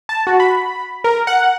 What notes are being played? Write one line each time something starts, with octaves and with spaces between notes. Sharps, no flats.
A5
F#4
B5
A#4
F#5